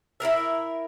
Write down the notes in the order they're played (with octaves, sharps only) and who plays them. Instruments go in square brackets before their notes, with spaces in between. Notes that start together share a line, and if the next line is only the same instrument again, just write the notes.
[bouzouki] E4 F4 A#4 E5